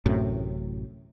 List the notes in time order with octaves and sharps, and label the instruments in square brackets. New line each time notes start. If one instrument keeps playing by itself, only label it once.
[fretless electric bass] A1 F#2 A2 C3